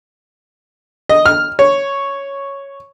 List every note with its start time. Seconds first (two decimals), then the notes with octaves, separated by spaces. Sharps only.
1.09 D#5
1.26 F6
1.59 C#5